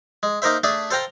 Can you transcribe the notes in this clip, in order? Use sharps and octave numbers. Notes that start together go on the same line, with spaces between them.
G#3
A#3 D#4 A#4 C5 E5
A3 D4 G#4 E5
A4 C5 F5 G5 A#5